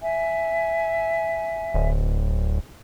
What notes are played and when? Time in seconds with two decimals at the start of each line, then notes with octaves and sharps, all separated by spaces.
0.01 E5 G#5
1.74 D1